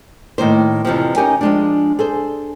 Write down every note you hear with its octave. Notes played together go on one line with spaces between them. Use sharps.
A2 D#3 A#3 C5
F2 C3 E3 F3
C#4 D#4 G4 A#4 G#5
F3 G#3 D4
G#4 A4 C5